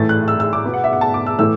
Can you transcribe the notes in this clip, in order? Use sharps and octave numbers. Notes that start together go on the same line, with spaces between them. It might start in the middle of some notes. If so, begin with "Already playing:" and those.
Already playing: A2 E3 A3 A6
F#6
E6
E6
D6
B2 B3
F#5
E5
F#5
A5
D6
E6
A2 E3 A3 E6